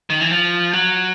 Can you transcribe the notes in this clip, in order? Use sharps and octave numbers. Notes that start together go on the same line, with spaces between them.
D#3
E3
F3
F#3